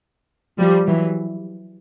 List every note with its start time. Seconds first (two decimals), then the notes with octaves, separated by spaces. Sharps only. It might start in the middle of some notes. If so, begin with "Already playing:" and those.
0.59 F3 G3
0.87 E3 F#3